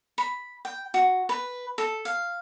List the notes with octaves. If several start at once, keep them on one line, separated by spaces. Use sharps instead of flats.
B5
G5
F#4
B4
A4
F5